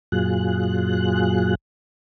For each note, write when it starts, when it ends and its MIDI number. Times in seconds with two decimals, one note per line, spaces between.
0.12 1.55 42
0.12 1.55 46
0.12 1.55 54
0.12 1.55 65
0.12 1.55 68
0.12 1.55 90